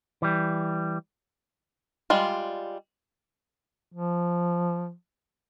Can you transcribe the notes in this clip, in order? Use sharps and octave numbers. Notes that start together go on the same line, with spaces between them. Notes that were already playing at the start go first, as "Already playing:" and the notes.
E3 G3
G3 G#3 F4
F3